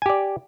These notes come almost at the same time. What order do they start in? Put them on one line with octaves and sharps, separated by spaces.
G#5 G4 D5